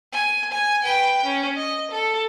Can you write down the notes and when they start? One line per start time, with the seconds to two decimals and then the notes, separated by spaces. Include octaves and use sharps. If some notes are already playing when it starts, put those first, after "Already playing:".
0.12 G#5
0.52 G#5
0.84 B4 G5
1.24 C#4
1.57 D#5
1.91 A4